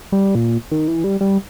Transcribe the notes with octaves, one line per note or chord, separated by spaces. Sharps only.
G3
A#2
D#3
E3
G3
G3